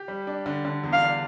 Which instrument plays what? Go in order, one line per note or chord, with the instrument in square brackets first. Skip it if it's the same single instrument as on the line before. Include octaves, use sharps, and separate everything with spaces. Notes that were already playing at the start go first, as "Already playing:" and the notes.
Already playing: [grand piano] G4
G3
D4
D3
D3
E2
[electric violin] F5
[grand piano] D4